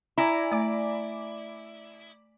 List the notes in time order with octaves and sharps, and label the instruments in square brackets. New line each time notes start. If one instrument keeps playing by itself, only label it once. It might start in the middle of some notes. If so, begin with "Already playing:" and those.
[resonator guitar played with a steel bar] E4 [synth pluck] D5 G#5 A#5
[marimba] A3 [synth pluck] D5 D6